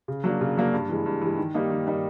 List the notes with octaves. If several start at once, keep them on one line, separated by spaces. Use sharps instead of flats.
C#3
F#3 A#3 D4
C#3
F#3 A#3 D4
G2
E3 G#3
G2
E3
G#3
D#3
G3 A#3 D#4
D#3
G3 A#3 D#4